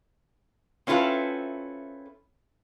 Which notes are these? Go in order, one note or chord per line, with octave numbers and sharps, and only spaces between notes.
C4 C#4 E4 F4 A4 B4